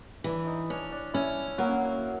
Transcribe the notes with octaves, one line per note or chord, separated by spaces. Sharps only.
E3 D4
D#4
C#4 D4
D4
C#4 E4
F#3 A#3 F#4